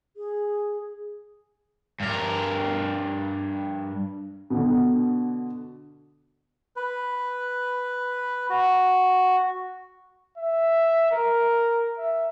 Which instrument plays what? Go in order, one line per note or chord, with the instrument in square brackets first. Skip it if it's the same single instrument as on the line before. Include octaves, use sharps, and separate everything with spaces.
[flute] G#4
[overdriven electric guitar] G2 A#4
[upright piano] B2 D3
[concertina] B4
F#4
[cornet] E5
A#4
E5